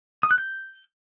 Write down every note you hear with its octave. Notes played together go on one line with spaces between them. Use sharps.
D#6
F#6
G6